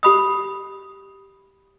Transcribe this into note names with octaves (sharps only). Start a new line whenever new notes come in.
G4 B5 D#6